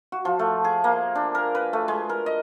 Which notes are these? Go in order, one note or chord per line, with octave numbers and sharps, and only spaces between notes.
F#4
F3
A3
G#4
A#3
D4
A#4
B4
A3
G#3
A#4
D#5